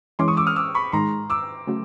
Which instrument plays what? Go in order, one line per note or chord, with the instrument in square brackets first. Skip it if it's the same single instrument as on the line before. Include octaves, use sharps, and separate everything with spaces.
[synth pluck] E3 G#3 C#4 [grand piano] C6 D6
[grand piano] C#6 D#6
D6 E6
D#6 F6
D6 E6
B5 C#6
[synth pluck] G#2 D#3 G#3 [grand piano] A#5 C6
[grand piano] D6 E6
[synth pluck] C#3 F#3 A3